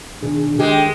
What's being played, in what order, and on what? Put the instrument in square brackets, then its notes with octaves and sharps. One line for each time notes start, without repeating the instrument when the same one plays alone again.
[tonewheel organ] B2 D#3 G#4 [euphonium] D4
[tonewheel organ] D#3 A4 [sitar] G#3 [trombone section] G4